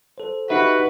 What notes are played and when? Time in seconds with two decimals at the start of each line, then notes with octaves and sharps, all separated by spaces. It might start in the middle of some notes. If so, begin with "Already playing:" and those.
0.18 A4 C5
0.50 D#4 F#4 G4 B4 E5